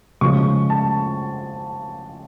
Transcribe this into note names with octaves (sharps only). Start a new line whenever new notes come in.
C#3 F3 G#3 C#6
A5